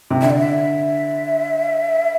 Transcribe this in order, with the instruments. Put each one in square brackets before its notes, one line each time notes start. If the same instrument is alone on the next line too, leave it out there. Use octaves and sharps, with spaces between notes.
[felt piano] C3
[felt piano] D3 [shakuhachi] E5
[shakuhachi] D5
E5